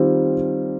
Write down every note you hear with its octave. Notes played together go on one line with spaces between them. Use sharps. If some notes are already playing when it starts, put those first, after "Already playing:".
Already playing: D#3 G3 C4 F4 A#4